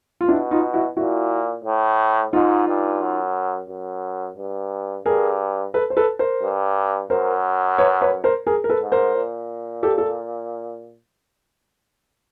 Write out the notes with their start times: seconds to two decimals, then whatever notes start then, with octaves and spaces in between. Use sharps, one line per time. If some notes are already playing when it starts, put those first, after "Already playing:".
0.21 F4
0.28 B2 D4 E4
0.51 D#4 F4
0.74 E4 F#4
0.97 A#2 E4 F#4
1.64 A2
2.33 G#2 D#4 F4
2.68 G2
3.01 F#2
3.69 F#2
4.37 G2
5.05 G2 G#4 A#4
5.74 A4 B4
5.90 C5
5.97 A4 B4
6.19 A#4 C5
6.42 G2
7.10 F#2 A#4 C5
7.78 B4 C#5
8.01 B4 C#5
8.24 A#4 C5
8.47 G#4 A#4
8.64 A#4
8.69 A4 B4
8.81 G#2
8.92 A#4 C5
9.15 A#2
9.83 G4 A4
9.98 A4